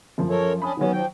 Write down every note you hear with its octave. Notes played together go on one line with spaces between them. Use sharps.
F#2 F3
A4 A#4 C#5
C#4 D4 B5 D#6
D#3 F#3 B3 C#4
F3 G5